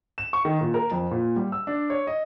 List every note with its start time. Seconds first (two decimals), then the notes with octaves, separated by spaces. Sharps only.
0.18 E7
0.33 C#6
0.45 D#3
0.61 A#2
0.74 A#4
0.91 F2
1.11 A#2
1.36 G3
1.52 E6
1.67 D4
1.90 C#5
2.07 D#5